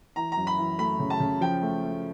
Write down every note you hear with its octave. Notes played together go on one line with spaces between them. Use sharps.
E3 A#5
A#5
F#2
B5
E3
A3 B5
C#3
A5
C#3
F3 G5
A3
A3